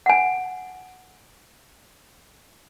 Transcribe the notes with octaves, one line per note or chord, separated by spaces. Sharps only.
F#5 G#5